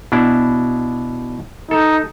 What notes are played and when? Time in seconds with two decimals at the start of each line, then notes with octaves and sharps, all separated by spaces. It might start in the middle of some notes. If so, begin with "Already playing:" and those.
0.12 B2 D4 E4
1.71 D#4 A4